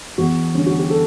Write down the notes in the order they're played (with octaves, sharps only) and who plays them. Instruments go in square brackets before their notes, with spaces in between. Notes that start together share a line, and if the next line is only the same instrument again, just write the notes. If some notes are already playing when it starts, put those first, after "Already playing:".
[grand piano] E2 F#4
D3 G3 C#4
F#4
G4
A4